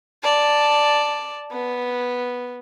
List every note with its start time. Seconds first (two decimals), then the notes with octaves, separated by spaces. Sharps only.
0.23 D5 A5
1.52 B3